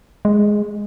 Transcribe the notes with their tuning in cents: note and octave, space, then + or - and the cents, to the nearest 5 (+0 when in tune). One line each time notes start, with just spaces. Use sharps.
G#3 +0